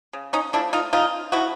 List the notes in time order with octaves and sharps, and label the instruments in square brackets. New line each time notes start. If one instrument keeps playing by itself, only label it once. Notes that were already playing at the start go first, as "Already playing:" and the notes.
[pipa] C#3
C#4 D#4
F3 A3 D4 E4
D#4 F4
C#3 D#4 F4
F3 A3 E4 F#4